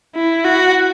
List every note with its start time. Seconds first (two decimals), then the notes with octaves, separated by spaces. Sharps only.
0.15 E4
0.44 F#4